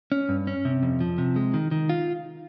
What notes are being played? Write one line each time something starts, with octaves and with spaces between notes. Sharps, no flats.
C#4
G2
C#4
C3
F2
F3
C3
G#3
D#3
D#3
F4